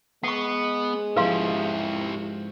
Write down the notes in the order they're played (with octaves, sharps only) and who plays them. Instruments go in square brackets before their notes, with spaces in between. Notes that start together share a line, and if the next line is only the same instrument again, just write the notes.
[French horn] G#3 [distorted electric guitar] B3 [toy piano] F#5 C#6
[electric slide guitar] G#2 F3 [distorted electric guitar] E4 G4 [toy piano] B4 F5 C6